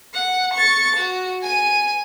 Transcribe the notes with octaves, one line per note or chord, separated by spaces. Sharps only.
F#5
C#6 A6
F#4
G#5 D#7